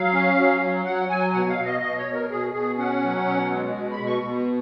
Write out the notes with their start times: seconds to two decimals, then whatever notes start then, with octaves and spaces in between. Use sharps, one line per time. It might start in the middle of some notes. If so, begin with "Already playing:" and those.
Already playing: F#3 F5
0.13 C#4
0.37 F#3
0.61 F#3
0.85 F#3 F#5
1.09 F#3 G#5
1.33 B2 F#5
1.49 F5
1.58 B2
1.65 D#5
1.82 B2 D#5
1.98 C#5
2.06 B2
2.14 A#4
2.30 B2 G#4
2.54 B2 G#4
2.78 C#4 F#5
3.03 F#3
3.26 B2
3.51 G#3
3.75 B2
3.91 B5
4.00 B2
4.07 C#6
4.23 B2